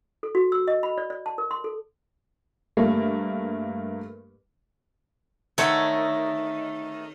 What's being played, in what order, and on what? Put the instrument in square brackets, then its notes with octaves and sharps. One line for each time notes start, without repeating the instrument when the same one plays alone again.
[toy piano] A4
F#4
E6
D#5
B5
D5
D5
A5
A#4
C6
A4
[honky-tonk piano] G2 A3 A#3
[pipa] D3 A3 F#5 [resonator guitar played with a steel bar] D#3 [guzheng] A4 C#5